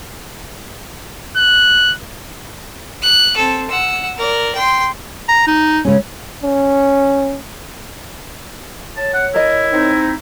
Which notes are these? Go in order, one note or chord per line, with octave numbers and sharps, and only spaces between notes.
F#6
F#6
C4 A4
F#5 E6
A#4 D5
G5 C6
A#5
D#4
C#3 G#3 C#4
C#4
C#5 A5
F#5
E4 A#4 D#5
C4 D#4